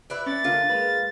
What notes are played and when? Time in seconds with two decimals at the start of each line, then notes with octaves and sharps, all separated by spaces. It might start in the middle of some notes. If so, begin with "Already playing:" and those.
0.10 E4 B4 D5
0.26 C#4 A6
0.44 D3 A#3 D4 F4
0.69 G#3 A#3 B4